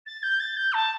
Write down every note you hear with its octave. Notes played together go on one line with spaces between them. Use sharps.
A6
G6
A6
G6
A5